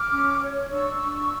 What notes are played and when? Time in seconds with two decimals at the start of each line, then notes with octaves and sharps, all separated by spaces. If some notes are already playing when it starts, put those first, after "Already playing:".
Already playing: D6 F6
0.10 C#4
0.41 C#5
0.71 D4 C#6 E6
1.02 D4